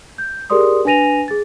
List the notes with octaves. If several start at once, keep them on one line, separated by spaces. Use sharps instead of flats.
G6
G4 G#4 A#4 D5 C6 D#6
D4 B4 G#5 A#6 D#7 F7
G#4 A6